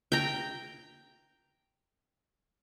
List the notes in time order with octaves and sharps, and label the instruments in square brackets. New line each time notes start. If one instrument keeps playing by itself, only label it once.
[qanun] G5 A#5